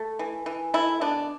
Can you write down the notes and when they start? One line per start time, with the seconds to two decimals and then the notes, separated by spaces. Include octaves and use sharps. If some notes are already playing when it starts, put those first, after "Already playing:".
Already playing: A3
0.19 E3
0.46 E3
0.74 A3 E4
1.01 B2 D4